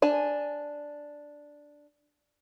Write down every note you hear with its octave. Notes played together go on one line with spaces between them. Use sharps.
D4 G#5 A5